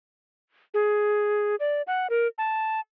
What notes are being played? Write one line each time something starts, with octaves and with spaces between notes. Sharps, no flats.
G#4
D5
F#5
A#4
A5